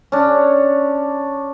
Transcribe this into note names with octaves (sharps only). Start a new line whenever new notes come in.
C#4 D4